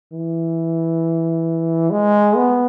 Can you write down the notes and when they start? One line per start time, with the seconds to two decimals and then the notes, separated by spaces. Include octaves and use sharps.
0.12 E3
1.90 G#3
2.36 B3